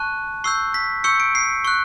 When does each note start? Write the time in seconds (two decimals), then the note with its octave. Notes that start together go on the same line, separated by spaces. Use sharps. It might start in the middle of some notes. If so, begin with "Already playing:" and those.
Already playing: A5 C#6 F#6
0.44 C#6 E6 G6 C7
0.74 B6
1.04 C#6 E6 G6 C#7
1.20 D7
1.35 C7
1.65 C#6 F#6